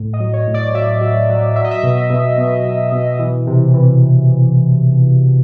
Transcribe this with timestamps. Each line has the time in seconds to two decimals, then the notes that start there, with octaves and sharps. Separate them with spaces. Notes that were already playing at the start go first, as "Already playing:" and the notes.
Already playing: A2
0.13 D#5
0.20 F#3
0.33 C#5
0.47 A2
0.54 D5
0.74 F#3 E5
1.01 F#3
1.29 F#3
1.56 F#3 E5
1.64 D#5
1.71 E5
1.83 B2
2.10 B2
2.38 B2
2.65 B2
2.92 B2
3.19 E3
3.47 C3
3.74 E3